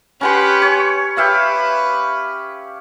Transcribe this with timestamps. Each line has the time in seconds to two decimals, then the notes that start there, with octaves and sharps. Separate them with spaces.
0.21 C#4 G4 B4 F#5 C6
0.62 C#5
1.17 G4 B4 E5 F5